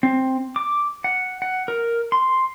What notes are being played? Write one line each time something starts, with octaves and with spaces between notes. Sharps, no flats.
C4
D6
F#5
F#5
A#4
C6